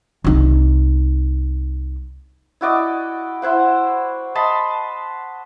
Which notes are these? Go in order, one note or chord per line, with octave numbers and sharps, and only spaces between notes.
C2 D#4
E4 F#4 D5 D#5
E4 C5 F#5
D#5 A5 B5 C6